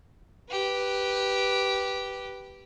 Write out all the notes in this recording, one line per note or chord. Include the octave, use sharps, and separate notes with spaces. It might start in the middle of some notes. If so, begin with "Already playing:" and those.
G4 B4